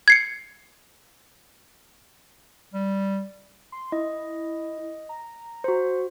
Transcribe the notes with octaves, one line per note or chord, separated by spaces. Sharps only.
G#6 C7 C#7
G3
C6
E4 D#5
A#5
F#4 C5